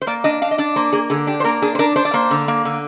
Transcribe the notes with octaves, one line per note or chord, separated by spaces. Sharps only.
C5
A#3 D5
D4 D#5
D4 F5
D#5
D4 D5
A#3 C5
A#3 G#4
D3 G#4
D4 G4
C5
A#3 A#4
D4 G#4
C5
D4 A#4
D4 C5
D5
A#3 C5
D3
A#3
D3